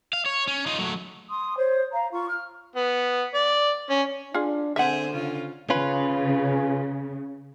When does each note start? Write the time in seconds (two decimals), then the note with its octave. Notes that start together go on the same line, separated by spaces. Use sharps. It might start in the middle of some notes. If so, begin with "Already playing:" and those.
0.13 F5
0.26 C#5
0.47 C#4
0.66 D#4 F4
0.79 F#3 A3
1.30 C6 D#6
1.57 C5 C#5
1.92 F5 A#5
2.11 F4 C#6
2.28 F6
2.75 B3
3.35 D5
3.90 C#4
4.34 D4 F4 G#4
4.76 D3 C4 G#4 C5 E5 F#5
5.12 C#3 F4
5.70 C#3 C#4 F4 B4